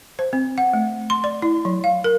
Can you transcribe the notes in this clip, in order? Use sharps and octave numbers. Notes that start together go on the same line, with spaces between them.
C5
C4
F#5
A3
C6
D5
E4
F#3
F5
A#4